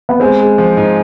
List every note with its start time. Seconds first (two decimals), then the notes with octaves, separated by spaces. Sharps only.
0.09 B3
0.20 G#3 C4
0.40 G#3
0.58 F3
0.77 G#2